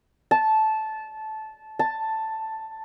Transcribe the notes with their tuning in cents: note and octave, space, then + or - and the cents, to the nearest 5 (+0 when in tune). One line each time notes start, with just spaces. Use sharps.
A5 -15
A5 +5